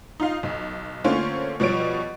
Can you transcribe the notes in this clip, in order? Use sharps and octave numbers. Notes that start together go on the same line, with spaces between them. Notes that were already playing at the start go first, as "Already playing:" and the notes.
D#4 F4 F5
B1
D3 A3 A#3 C#4 F4 C5
B2 F3 G3 C#5 D7